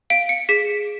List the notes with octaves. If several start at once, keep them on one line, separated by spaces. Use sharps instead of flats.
F5 D7
C#7
G#4 B6